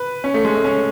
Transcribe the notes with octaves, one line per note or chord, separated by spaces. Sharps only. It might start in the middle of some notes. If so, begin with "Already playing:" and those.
Already playing: B4
C#4
A3
G#3
A3
C#4